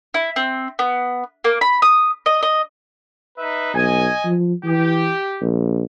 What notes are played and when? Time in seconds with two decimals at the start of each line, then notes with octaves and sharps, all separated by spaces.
0.14 E4
0.36 C4
0.79 B3
1.44 A#3
1.61 B5
1.82 D#6
2.26 D#5
2.43 D#5
3.38 D#4 B4 E5
3.74 B1 D#5 G#5
4.25 F3
4.65 E3 G4
5.41 A#1